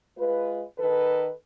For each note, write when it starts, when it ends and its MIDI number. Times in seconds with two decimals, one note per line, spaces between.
0.18 0.62 56
0.18 0.62 65
0.18 0.62 71
0.78 1.30 51
0.78 1.30 69
0.78 1.30 71